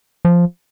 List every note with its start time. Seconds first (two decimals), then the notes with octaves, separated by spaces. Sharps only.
0.25 F3